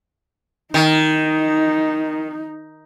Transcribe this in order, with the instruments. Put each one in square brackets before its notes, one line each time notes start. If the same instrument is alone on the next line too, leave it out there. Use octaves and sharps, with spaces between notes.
[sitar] D#3 [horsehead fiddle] D#4